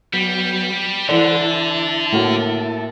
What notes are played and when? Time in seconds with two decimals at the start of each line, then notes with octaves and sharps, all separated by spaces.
0.13 F#3 G3 B3
1.09 D3 E3 A4 C5 D5 F#5
1.40 E4 A5
2.12 A2 A#3 F#4